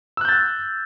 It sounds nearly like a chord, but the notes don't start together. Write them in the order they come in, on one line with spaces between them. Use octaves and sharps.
E6 F#6 G6 A6